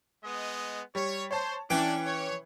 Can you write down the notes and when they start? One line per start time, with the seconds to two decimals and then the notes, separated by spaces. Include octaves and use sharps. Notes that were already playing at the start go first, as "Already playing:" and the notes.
0.24 G#3 B3 D#5
0.95 G3 C#5
1.31 C5 C#5 A5
1.70 E3 C#4 D4 G5 D6
2.05 C#5